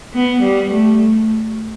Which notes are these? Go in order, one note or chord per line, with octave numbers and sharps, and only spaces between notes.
B3
G3
A3